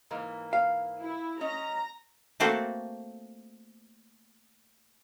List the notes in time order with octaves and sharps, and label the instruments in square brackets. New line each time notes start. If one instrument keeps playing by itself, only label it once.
[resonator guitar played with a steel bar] G#2 E3 A#3
[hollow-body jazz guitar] F5
[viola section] E4
[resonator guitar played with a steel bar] C#4 D#5 [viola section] A#5
[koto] A3 A#3 C4 F#4 A4